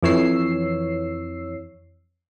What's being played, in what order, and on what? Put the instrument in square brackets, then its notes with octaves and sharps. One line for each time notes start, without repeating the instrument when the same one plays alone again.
[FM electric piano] F2 E3 C#5 E6 C7